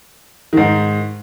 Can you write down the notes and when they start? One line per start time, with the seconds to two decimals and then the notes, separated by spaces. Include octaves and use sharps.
0.53 G#2 D#3